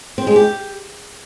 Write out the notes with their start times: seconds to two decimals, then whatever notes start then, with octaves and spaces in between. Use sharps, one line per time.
0.18 C4
0.27 G#3
0.36 G4